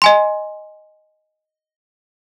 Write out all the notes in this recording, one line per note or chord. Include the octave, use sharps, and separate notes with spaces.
D#5 G#5 C6